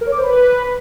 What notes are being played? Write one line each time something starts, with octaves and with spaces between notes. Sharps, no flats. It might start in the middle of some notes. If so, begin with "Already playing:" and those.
A#4
C#5
D6
C5
B4